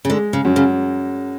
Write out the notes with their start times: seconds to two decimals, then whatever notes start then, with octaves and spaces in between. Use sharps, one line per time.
0.05 C#3
0.09 D3 G#3
0.33 C#3
0.45 F#2
0.56 C#3